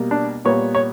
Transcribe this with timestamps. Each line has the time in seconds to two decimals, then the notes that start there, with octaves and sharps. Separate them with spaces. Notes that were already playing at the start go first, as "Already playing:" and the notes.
Already playing: B2 G3 A#3
0.11 D4
0.45 A#2 G3 B3 C#5
0.75 C#5